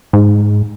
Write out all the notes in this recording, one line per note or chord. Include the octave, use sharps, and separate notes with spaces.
G#2